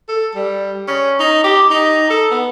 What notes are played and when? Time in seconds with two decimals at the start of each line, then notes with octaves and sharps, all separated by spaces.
0.09 A4
0.35 G3
0.88 C#4
1.19 D#4
1.44 G4
1.70 D#4
2.10 A4
2.31 B3